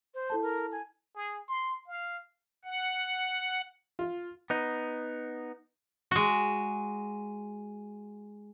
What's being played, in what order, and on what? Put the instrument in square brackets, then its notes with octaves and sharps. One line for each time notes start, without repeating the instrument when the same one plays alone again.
[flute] C5
[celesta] E4 A4 A5
[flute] A#4
G#5
[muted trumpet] G#4
C6
F5
[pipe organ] F#5
[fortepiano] F4
[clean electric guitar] B3 D#4
[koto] G#3 F#4